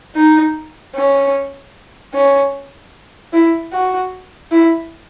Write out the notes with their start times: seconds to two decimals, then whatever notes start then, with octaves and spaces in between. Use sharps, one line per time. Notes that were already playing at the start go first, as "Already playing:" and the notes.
0.15 D#4
0.95 C#4
2.14 C#4
3.33 E4
3.72 F#4
4.51 E4